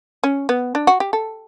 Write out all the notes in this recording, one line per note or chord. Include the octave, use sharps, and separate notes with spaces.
C#4
B3
D4
F#4
G4
A4